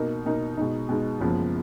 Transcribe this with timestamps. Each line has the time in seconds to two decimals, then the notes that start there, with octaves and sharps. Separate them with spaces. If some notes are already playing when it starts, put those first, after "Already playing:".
Already playing: B2 A#3 D#4 A#4
0.26 B2 A#3 D#4 A#4
0.57 B2 G#3 D#4
0.89 B2 G#3 D#4
1.20 F#1 F#2 F3 G#3 B3